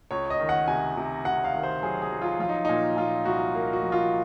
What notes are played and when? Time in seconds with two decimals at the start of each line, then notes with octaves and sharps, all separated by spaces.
0.11 C#2 C#5
0.30 D#5
0.40 D#3
0.49 F#5
0.68 C3 G#5
0.97 C3
1.25 C3 F#5
1.44 F5
1.54 D#3
1.63 C5
1.82 F#3 G#4
2.02 G#4
2.12 F#3
2.22 F4
2.40 F3 F4
2.49 D#4
2.65 A#2 D#4
2.97 A#2 F4
3.25 C2 F#4
3.55 A#3
3.73 F#4
3.83 F3
3.92 F4